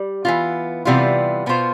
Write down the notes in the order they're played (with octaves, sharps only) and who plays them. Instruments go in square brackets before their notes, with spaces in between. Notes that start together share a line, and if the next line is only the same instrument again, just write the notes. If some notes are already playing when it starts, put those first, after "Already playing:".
Already playing: [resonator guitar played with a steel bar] G3
E3 B3 F4
C3 E3 G3 B3 F4
B2 B3 F4 C5